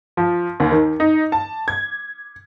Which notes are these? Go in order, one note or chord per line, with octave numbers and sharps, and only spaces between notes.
F3
D#2
D#3
D#4
A5
G#6